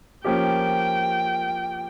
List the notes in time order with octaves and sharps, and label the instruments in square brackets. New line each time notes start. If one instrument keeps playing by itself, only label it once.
[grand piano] F3 A#3 C#4 G4 [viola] G5